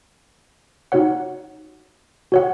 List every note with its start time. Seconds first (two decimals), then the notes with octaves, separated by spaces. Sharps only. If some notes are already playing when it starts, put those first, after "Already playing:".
0.92 D#4 F#4 C#5 F#5
2.32 F#4 C#5 F#5